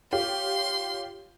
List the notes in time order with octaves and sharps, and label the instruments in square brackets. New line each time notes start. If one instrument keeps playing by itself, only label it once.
[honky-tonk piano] F4 G4 C#5 [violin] C6